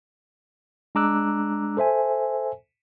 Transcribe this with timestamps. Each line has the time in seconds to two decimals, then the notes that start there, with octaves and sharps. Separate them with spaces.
0.95 G#3 D4 A#5 D6 E6 F#6
1.77 A4 C5 E5 G#5